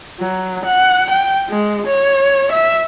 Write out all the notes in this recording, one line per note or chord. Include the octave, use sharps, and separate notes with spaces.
F#3
F#5
G5
G#3
C#5
E5